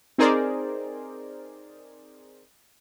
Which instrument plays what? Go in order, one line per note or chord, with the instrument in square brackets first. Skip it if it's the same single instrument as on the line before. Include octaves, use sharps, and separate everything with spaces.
[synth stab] C4 D#4 G#4 A#4 C5 D5